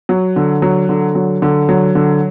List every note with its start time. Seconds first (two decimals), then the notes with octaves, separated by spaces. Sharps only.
0.09 F#3
0.36 D3
0.62 F#3
0.89 D3
1.15 F#3
1.42 D3
1.69 F#3
1.95 D3